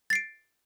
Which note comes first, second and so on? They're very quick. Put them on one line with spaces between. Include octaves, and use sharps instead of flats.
A6 C7 D7